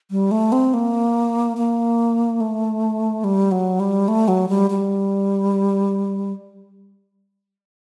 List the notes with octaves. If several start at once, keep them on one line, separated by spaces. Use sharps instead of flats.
G3
A3
C4
A#3
A#3
A3
G3
F#3
G3
A3
F#3
G3
G3